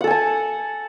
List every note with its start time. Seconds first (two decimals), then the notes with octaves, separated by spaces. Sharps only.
0.01 F#5
0.04 A4
0.07 G#5
0.11 A5